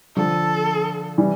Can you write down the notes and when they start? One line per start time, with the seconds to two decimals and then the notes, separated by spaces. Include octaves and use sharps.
0.17 D3 F3 A4
1.18 E3 G3